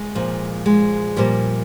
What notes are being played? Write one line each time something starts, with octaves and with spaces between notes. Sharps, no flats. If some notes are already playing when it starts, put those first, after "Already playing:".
Already playing: G#3
A#2 F3
G#3
A#2 F3 G3